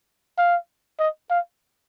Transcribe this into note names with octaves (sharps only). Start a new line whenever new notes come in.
F5
D#5
F5